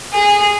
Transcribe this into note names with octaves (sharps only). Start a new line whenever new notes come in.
G#4